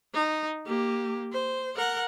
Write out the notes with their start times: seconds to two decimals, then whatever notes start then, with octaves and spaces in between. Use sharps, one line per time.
0.14 D#4
0.66 A#3 G4
1.33 C5
1.76 A#4 F#5